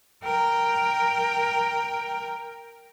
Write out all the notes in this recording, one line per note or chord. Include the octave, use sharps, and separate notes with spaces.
A#4 G5